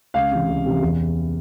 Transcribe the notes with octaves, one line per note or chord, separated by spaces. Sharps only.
C#2 F5
C3 E3
C#2
C3 E3
E2